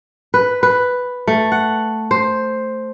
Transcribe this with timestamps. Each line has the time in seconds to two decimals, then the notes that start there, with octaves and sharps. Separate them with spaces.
0.34 B4
0.63 B4
1.27 A3
1.52 F#5
2.11 C5